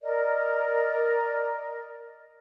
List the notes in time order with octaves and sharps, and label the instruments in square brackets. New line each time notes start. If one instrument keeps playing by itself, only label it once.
[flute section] A#4 D5 D#5